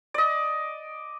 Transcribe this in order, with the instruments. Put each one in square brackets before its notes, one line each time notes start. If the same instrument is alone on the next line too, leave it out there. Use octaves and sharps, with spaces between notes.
[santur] D5 D#5